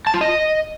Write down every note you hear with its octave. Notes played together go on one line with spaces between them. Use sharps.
A5
F4
D#5